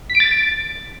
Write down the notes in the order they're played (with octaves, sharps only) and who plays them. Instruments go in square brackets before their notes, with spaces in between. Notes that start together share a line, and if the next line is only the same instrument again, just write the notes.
[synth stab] B6
D7
A6